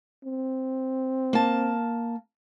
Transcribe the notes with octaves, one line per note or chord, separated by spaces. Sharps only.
C4
A#3 A5